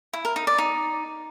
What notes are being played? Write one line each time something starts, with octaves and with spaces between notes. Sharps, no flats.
E4
A#4
D#4
D5
D#4